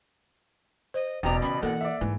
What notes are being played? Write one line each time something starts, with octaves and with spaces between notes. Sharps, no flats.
C5 D#5
E1 A1 B2 D5 G5 A#5
C#3 B5
E3 A#3 A4 A#4 F#5
D5 E5
G#2 E3 A3